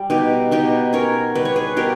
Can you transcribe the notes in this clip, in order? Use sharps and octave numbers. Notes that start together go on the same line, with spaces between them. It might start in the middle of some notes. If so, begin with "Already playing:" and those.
Already playing: G3
B2 D#4 G4
B2 D#4 G4
C#4 A#4 C#5
G3 B4
C#5
G#4 B4
B2 G4 A#4